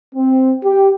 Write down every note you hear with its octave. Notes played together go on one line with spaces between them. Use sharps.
C4
G4